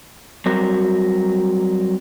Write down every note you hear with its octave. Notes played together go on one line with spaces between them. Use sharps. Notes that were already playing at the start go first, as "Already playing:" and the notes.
F#3 G3 C4 F#4 A#4